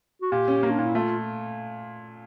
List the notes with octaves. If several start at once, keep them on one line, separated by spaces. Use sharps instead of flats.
F#4
A#2 G4
C#4
A#3
D4
A#2 D#4
E4
A3 F4